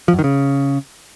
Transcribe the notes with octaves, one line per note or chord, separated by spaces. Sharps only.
F3
F#2
D#3
C#3